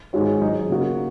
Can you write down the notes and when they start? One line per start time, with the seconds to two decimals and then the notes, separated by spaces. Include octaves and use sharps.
0.13 G#2 D#3 G#3 F#4 C#5
0.41 F#3 D#4 G#4 D#5
0.70 C#3 A#3 F#4